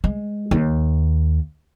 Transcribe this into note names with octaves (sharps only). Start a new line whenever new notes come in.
G#3
D#2